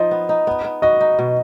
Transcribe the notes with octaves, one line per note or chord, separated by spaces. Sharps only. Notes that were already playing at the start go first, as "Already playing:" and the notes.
Already playing: F3 D#4 D#5
B3
D#4
B3
B3
F#4 D#5
D#4
B2